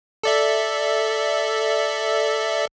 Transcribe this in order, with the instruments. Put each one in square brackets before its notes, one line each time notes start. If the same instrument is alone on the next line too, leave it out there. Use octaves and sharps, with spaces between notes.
[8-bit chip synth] A4 D5 E5